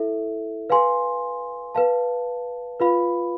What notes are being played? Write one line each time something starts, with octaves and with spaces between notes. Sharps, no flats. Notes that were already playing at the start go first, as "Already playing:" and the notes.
Already playing: E4 A4 E5
B4 F5 G#5 C6
B4 F5 A5
F4 B4 F5 B5